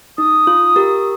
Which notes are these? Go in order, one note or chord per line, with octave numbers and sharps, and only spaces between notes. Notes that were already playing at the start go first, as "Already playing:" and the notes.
D#4 D#6
F4
G4 A#4